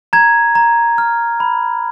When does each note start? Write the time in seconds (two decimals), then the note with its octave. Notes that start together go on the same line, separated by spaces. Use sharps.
0.13 A#5 G#6
0.55 A#5
0.98 F6
1.40 B5